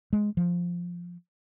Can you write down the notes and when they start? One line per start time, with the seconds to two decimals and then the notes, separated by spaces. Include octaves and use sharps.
0.13 G#3
0.37 F3